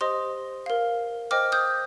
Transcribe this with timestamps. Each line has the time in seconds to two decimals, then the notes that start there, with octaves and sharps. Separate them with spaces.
0.01 G4 C5 D#5 C6 D#6
0.66 A#4 F5
1.31 C5 D#5 G5 D6 F6
1.52 D#6 G6